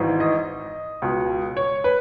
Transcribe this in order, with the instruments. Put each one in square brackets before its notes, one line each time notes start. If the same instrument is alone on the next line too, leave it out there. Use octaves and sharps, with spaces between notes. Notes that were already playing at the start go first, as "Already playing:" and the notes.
Already playing: [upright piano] G#1 G#2 E3
D#5
C#2 B2
C#5
B4